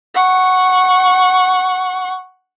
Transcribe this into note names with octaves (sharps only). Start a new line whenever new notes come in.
F#5 C#6